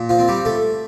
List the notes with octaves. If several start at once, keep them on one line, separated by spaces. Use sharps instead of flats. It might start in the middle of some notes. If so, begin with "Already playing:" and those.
Already playing: A#2
F3 F4
C4
G3 G4
A3 A4